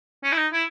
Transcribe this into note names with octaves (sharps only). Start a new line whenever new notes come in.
C#4
E4
D#4
E4